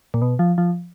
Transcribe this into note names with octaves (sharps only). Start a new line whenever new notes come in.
A#2
B2
F3
F3